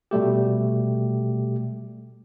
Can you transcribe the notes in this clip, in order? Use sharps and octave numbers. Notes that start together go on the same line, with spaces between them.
B2 G3 A3 G4